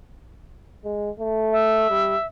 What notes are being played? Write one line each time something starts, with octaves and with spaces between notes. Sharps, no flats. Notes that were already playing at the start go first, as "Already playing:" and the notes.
G#3
A3
E5
G3